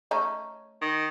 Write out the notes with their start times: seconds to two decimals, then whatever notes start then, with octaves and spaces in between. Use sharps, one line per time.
0.11 A3 C#4 D#4
0.82 D#3